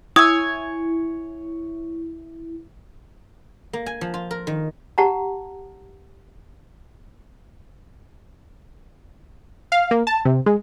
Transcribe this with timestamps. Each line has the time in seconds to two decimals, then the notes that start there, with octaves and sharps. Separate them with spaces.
0.16 E4 C#5 G#5 D#6 E6
3.73 A#3
3.86 G#5
4.01 F3
4.14 F4
4.31 A#4
4.47 D#3
4.98 G4 F#5 A5 A#5
9.72 F5
9.91 A#3
10.07 A5
10.25 C3
10.46 G#3